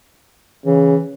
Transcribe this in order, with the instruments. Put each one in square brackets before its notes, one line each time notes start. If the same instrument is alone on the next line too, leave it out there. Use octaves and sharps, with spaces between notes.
[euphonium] C#3 [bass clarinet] E3